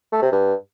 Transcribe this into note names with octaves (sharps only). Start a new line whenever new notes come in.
A3
C3
G2